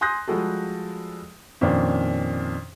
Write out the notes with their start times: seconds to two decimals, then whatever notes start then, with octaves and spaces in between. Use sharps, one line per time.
0.01 G#5 C6 D#6 F#6 G6 A#6
0.28 F3 G3 G#3 F#4 G#4 A4
1.61 F2 A#2 D#3 A#3 C#4 D4